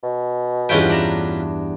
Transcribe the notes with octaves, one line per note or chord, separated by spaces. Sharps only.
B2
E2 G2 C#4 F4 B4 G5
D4 A#5